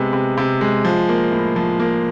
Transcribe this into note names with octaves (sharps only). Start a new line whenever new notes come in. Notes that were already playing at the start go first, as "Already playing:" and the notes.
Already playing: C3 G#3 B3
C3
C3
G#3
F3
A#3
A2
F3
A#3